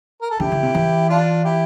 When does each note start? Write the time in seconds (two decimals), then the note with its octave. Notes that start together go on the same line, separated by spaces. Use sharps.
0.21 A#4
0.30 A4
0.40 D3 E4 G4
0.52 D3
0.63 C3
0.75 E3
1.09 D4 F4
1.45 E4 G4